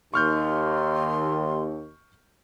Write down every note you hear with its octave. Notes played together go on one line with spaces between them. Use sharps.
D#2 C6 C#6 F6 G6